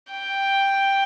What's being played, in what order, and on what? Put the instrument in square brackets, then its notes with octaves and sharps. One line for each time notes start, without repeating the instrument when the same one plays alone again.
[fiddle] G5